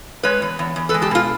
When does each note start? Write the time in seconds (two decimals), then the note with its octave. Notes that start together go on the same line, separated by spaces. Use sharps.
0.23 G#3 B4 C#5
0.42 E2
0.59 E2
0.76 E2
0.89 A4 B4
0.94 G#3
1.02 G4 A4
1.11 B2 F4